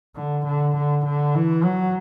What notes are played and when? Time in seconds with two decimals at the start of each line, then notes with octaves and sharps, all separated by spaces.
0.15 D3
0.45 D3
0.75 D3
1.05 D3
1.35 E3
1.64 F#3